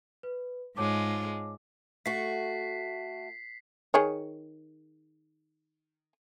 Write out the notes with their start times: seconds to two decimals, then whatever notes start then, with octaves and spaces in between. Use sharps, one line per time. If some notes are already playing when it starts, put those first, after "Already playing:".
0.23 B4
0.77 G#2 G#3 F4 C#5 A5 D6
2.06 A3 F#4 B6 C7
3.94 D#3 G#4 C#5